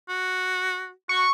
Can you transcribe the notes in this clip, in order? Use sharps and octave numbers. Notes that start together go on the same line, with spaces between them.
F#4
F#4 C#6